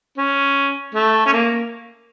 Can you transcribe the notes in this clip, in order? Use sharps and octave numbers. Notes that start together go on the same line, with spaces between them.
C#4
A3
C#4
A#3